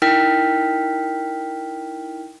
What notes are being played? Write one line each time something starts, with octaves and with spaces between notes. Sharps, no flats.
D#4 E4 A#4 G5 F6 B6